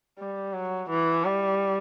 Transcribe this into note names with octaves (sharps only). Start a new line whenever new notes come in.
G3
F#3
E3
G3